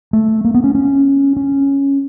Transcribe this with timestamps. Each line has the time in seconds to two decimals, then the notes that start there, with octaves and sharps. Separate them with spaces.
0.13 A3
0.44 A#3
0.54 B3
0.64 C#4
0.75 C#4
1.36 C#4